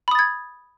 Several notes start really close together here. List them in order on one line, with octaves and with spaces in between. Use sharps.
B5 D#6 A6 G#6